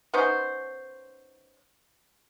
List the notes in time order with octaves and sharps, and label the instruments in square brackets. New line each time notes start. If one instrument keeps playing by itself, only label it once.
[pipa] B3 C#4 D#4 C5